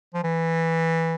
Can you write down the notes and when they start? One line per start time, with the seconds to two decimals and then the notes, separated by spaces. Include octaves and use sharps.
0.14 F3
0.24 E3